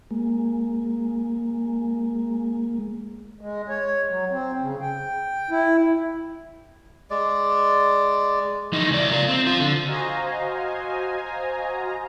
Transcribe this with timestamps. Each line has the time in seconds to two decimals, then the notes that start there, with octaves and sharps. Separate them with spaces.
0.11 G#3 A#3
3.41 G#3
3.69 C#5
4.10 F#3
4.31 C4
4.61 C#3
4.81 G5
5.50 E4
7.10 G#3 D5
8.73 E3 D#4
8.89 C#2 D5
9.11 F4 A#4
9.28 C4
9.47 F4 C5
9.60 D3
9.87 F#4 C5 D#5 F5 G#5 A#5